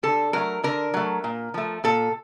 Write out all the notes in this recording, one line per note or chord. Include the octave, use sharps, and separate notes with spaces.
D3 A4
F#3 A3 A#4
D3 A#4
F#3 A3
A#2
F3 A3
A#2 A4